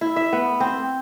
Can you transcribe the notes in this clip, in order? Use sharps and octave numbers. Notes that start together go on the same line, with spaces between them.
E4
E5
B3
C4